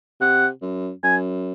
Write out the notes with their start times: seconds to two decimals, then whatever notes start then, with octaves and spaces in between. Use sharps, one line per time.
0.21 C3 F#5
0.62 F#2
1.04 F#2 G#5